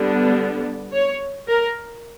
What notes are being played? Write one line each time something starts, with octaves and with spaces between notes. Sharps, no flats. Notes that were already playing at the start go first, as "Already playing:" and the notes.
Already playing: D3 G3 B3 D4
C#5
A#4